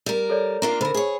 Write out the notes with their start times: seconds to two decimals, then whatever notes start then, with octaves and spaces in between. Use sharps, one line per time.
0.06 G3 A#4
0.30 A4 C#5 D5
0.62 A#3 D4 F4 A#5
0.81 D3 A#4 C5 B5
0.94 G#4 C#5